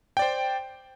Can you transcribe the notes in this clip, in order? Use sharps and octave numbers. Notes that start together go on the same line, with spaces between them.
C5 D5 G5